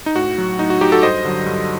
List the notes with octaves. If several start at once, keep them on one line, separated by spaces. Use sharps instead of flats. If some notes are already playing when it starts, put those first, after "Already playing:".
D#4
A2 F#4
F#3
A2 D#4
F#4
F#3 D#4 G4
F#4 A4
G2 C5 D#5
D3 F#3
G2